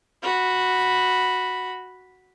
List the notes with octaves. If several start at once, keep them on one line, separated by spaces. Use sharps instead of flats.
F#4 B5